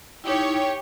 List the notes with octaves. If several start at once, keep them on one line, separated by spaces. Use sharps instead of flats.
D#4 E4 G4 C#5